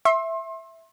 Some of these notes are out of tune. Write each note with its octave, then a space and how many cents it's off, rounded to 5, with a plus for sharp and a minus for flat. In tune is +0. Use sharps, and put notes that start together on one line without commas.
E5 +0 C6 +35